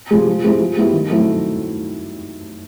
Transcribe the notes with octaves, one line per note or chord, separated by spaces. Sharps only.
C3 F3 G#3
F3
G#3 C4 E4 G4
F3
G#3 B3 E4 G4
D#3
F#3 A3 C4 E4